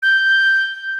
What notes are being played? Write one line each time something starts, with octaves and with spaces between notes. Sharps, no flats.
G6